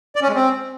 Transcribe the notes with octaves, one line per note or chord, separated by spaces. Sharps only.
D5
C#4
G#3
C4